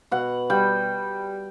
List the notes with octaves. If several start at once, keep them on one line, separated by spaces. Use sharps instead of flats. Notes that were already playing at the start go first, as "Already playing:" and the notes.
B2 F#5
G3 G5